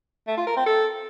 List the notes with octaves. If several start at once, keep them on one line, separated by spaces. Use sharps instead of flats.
A3
F4
A#4
C4
A4